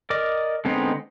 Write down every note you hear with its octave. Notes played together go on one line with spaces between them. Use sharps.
A#4 D5 D#5 D6
D3 G#3 B3 C4 D#4